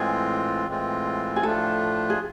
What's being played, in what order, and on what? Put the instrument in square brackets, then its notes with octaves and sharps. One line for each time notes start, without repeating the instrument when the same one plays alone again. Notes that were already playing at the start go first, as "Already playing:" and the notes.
Already playing: [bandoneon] A2 E3 G#3 C4 F4 [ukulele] G#4
[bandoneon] A2 E3 G#3 C4 F4
[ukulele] G#4
[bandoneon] A2 F3 A3 D4 F4 [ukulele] A4
[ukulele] G#4